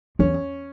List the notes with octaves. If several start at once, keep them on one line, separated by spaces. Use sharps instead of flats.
E2 C#4